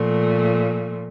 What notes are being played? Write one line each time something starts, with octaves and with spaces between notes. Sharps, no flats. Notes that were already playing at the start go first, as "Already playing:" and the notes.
Already playing: A#2 F3 A3